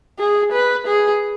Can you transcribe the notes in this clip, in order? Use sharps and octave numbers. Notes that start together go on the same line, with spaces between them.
G#4
B4
G#4